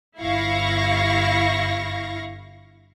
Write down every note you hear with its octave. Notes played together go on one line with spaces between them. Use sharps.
G1 E4 F5 C#6 A#6